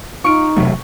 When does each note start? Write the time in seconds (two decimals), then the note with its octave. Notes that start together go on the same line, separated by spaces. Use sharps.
0.24 D#4 F4 C#6 F6 D7
0.56 E1 C3 F#3 A3